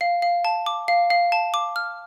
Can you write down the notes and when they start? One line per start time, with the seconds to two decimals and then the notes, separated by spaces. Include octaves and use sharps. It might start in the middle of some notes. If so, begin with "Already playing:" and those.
0.01 F5
0.22 F5
0.45 A5
0.66 D6
0.88 F5
1.10 F5
1.32 A5
1.54 D6
1.76 F6